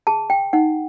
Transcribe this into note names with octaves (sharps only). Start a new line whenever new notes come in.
G#4 A5
G5
D#4 F#5